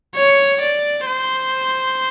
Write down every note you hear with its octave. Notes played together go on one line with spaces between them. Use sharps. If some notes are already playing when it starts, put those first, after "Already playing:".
C#5
D5
C5